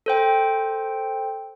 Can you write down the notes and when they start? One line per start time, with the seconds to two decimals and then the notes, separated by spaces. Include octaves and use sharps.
0.06 A4 C5 G5